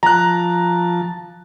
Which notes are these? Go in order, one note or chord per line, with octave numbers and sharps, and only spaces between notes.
F3 A5 A#5 F#6